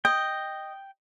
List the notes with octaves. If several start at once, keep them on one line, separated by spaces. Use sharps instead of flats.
D#5 G5